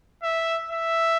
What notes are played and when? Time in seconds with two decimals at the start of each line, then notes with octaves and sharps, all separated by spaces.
0.23 E5
0.71 E5